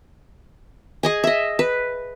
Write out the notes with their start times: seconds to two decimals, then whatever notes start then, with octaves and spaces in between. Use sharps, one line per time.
1.03 G#4 D#5 G#5
1.24 D#5 E5
1.59 B4